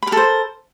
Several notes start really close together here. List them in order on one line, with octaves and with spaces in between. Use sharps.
B5 A#4 A4 C5